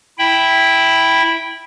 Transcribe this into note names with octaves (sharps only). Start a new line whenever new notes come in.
E4 E5 G5 B5